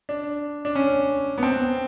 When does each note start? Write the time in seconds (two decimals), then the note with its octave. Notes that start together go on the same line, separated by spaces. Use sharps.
0.09 D4
0.65 D4
0.75 C#4
1.38 B3
1.43 C4